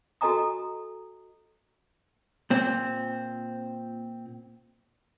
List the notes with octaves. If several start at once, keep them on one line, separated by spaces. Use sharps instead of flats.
F#4 A4 D#5 G#5 A#5 D#6
A#2 C4